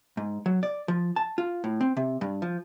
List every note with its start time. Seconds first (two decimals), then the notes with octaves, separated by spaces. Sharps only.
0.17 G#2
0.46 F#3
0.63 D5
0.88 F3
1.16 A5
1.38 F4
1.64 A2
1.81 C4
1.97 C3
2.21 G2
2.42 F3